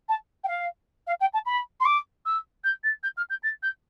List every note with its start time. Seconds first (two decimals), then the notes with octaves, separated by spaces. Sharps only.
0.09 A5
0.44 G5
0.48 F5
1.07 F5
1.20 G5
1.33 A5
1.46 B5
1.80 C6
1.85 D6
2.25 E6
2.64 G6
2.84 A6
3.03 G6
3.17 F6
3.30 G6
3.43 A6
3.63 G6